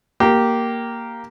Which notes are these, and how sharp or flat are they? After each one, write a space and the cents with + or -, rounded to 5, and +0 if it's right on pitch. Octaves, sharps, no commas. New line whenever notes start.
A#3 +0 G4 -10